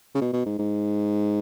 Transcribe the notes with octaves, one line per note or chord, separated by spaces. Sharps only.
C#3
B2
B2
G#2
G#2